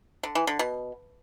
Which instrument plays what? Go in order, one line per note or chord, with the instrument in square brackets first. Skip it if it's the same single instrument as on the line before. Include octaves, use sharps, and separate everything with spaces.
[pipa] D3
E3
D3
B2